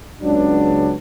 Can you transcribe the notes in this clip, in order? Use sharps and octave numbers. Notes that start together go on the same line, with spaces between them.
C#2 C#3 F#3 B3 D4